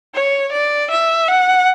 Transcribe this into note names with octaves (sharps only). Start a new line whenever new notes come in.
C#5
D5
E5
F#5